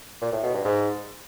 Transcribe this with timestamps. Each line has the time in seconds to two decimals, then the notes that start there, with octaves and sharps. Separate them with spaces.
0.21 A#2
0.32 A2
0.43 B2
0.54 G2
0.65 G#2